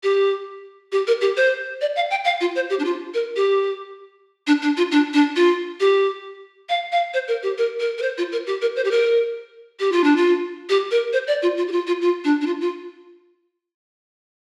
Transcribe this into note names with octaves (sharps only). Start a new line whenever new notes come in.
G4
G4
A#4
G4
C5
D5
F5
G5
F5
F4
C5
G4
D4
F4
A#4
G4
D4
D4
F4
D4
D4
F4
G4
F5
F5
C5
A#4
G4
A#4
A#4
A#4
C5
F4
A#4
G4
A#4
C5
G4
A#4
G4
F4
D4
F4
G4
A#4
C5
D5
F4
F4
G4
F4
F4
F4
D4
D4
F4
F4